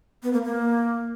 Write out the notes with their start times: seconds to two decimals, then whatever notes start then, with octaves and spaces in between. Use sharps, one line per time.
0.23 B3
0.33 A#3
0.43 A#3